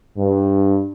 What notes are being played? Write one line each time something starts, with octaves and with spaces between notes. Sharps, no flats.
G2